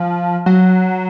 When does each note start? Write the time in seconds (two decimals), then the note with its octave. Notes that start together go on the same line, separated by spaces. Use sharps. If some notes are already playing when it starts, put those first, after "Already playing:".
Already playing: F3
0.46 F#3